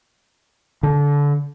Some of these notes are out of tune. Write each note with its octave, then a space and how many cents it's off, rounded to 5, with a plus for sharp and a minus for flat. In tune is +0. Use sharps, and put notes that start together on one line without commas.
D3 -25